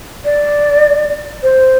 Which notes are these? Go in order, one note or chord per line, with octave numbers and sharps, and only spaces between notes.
D5
C5